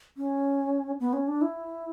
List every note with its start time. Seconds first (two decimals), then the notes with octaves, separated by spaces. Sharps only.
0.17 C#4
1.00 B3
1.13 C#4
1.28 D4
1.42 E4